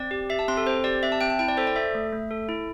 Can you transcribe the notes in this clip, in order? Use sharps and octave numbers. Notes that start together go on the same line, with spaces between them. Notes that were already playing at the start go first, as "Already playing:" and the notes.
Already playing: C4 D5
G4
G4 E5
A5
C4 C6
A4
C4 C5
G4 D5
C4 E5
A5
C4 G5
A5
E4 G5
D5
A4 C5
D5
A4 E5
A3
A3
A4
E4